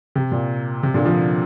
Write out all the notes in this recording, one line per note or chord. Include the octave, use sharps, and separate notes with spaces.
C3
A#2
C3
A#2 D3
D3 F3